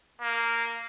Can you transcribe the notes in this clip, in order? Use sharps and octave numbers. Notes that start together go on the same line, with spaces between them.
A#3